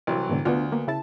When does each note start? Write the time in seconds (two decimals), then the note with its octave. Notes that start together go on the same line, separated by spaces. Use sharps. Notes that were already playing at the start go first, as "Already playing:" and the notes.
0.07 C2 E3 F#3
0.29 G#2 B2 D3
0.45 D2 B3 D4 F4
0.72 A#3 B3
0.87 C#3 E4 A5